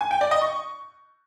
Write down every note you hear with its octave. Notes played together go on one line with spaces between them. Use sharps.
G#5
G5
D5
D#5
C#6